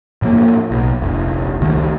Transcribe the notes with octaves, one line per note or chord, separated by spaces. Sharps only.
A2 F3 A#3
B1
F1 A#1
C#2 D#3 A3